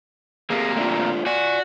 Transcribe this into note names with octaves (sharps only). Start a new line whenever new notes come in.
C3 A#3 G4 G#4
A3 D4 F4
F#4 D5 G#5